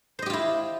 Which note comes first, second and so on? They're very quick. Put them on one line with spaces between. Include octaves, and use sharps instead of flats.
C5 D#5 G4 F4 E4